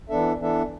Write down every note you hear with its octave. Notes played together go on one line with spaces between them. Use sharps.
E3 B3 D4 A4 E5
E3 B3 D4 A4 E5